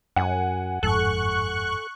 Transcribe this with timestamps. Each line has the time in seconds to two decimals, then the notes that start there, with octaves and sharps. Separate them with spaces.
0.16 F#2 F#5 G#5
0.83 G1 F2 G#2 A4 C#6 F#6